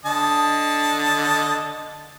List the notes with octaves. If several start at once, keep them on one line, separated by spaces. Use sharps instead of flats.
D3 D#5 A5